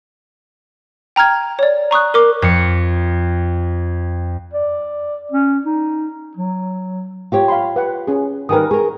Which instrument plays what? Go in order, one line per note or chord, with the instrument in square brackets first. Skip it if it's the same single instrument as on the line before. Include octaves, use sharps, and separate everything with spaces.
[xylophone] G5 A#5 F6 G#6
C#5 D5
A#5 C#6 D#6 F#6
A#4 D6
[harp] F2 C#7
[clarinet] D5
C#4
D#4
F#3
[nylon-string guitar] F4 G4 C#5
[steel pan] F5 B5 C6
B4 F#5
C#4 G#4
[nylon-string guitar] D#3 G3 B4 [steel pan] A#4 G#5 D#6
[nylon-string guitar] G#4 A#4 [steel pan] C#6